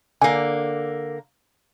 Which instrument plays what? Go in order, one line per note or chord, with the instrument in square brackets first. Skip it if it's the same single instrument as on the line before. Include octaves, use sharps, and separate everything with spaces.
[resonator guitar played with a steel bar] D3 A#3 [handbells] G#5